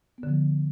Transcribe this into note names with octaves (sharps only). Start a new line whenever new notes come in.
B3
D3
F3